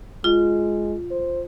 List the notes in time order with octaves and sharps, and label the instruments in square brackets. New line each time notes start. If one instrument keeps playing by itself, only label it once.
[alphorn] G#3 [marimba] F4
[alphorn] C5